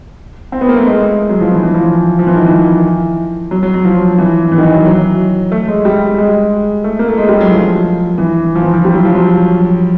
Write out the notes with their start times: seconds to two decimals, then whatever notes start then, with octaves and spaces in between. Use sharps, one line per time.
0.52 C4
0.61 B3
0.69 A#3
0.77 A3
0.86 G#3
1.29 F#3
1.41 F3
1.52 E3
1.63 E3
1.74 F3
2.19 F3
2.27 E3
2.36 D#3
2.45 E3
3.51 F#3
3.63 F#3
3.74 F#3
3.85 F3
4.18 E3
4.52 E3
4.58 D#3
4.63 E3
4.74 F#3
4.85 F#3
5.52 A3
5.68 G#3
5.85 G3
6.18 G#3
6.84 A3
6.99 A#3
7.09 A3
7.18 G#3
7.29 G3
7.41 F#3
7.51 F3
8.18 E3
8.56 F3
8.62 E3
8.74 F3
8.85 G3
8.94 F#3
9.05 F3
9.15 F#3